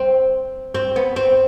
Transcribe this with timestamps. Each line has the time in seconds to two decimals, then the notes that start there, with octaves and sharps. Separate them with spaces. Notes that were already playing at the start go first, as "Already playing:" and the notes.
Already playing: C4
0.75 C4
0.96 B3
1.16 C4